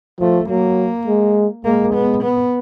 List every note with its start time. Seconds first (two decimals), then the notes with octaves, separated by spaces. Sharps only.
0.20 F3 A3
0.49 F#3 A#3
1.07 G#3
1.65 G#3 A#3
1.94 B3
2.23 B3